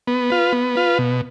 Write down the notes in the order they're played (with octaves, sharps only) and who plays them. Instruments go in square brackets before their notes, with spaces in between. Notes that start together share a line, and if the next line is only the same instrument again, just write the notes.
[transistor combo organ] B3
F4 B4
B3
F4 B4
B2